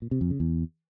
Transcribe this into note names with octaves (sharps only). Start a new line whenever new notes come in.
A#2
C3
F2
C#3
E2